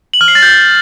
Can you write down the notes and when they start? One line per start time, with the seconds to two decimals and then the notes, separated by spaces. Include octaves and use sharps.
0.14 F#7
0.21 F6
0.28 C7
0.35 A6
0.43 G6